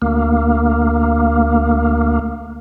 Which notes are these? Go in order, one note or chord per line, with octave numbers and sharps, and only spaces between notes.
D2 A#3